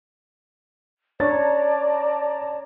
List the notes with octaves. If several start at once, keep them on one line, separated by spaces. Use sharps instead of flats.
D4 C#5 D5 A5 A#5 A6